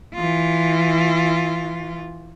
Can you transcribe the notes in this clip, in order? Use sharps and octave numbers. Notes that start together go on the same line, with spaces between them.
E3 F4